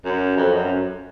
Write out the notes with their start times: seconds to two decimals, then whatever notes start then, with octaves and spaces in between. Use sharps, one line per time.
0.04 F#2
0.37 F2
0.53 F#2